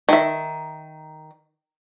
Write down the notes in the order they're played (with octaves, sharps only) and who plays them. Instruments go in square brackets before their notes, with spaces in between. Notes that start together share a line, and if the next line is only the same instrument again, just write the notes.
[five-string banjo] D#3 E5